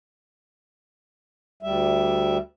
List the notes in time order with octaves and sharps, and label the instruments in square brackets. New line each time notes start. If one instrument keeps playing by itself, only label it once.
[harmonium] D2 G3 E5